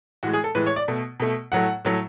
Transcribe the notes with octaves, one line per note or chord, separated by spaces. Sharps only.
A2 E3 G#3 F#4
G#4
A4
A2 E3 G#3 B4
C#5
D5
B2 A3
B2 A3
A2 F#3 A3 F#5
A2 F#3 A3